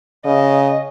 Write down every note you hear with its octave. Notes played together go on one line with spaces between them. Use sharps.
C#3 D#5